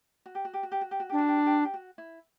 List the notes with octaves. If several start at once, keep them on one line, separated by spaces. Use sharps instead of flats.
F#4
G4
F#4
G4
F#4
G4
F#4
G4
F#4
D4 G4
F#4
G4
F#4
G4
F#4
G4
F#4
E4